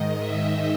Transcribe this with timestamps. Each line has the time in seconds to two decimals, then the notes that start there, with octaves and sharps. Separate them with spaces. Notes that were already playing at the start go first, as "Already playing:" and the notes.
Already playing: G#2 D#3 D#5
0.18 E5